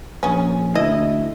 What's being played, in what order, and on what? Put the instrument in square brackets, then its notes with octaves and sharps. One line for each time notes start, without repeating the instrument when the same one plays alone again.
[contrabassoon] A#1 [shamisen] C#3 C#4
[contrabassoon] D2 [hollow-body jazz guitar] E4 [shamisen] D#5